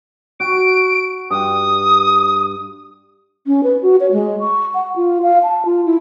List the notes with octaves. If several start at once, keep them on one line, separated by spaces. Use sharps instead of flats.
F#4 D7
G2 D#6
C#4
B4
F#4
C#5
G#3
C#6
F#5
F4
F5
A5
F4
E4